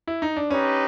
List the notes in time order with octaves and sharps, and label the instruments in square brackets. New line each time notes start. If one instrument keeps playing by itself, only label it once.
[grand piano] E4
D#4
D4
[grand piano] C#4 [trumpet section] D#4 G4 B4